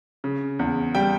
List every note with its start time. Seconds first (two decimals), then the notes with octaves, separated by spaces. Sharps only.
0.24 C#3
0.59 E2
0.95 G3 G5